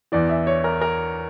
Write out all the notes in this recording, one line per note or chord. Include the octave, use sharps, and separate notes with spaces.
E2 E3 D5
E5
C#5
A#4
A#4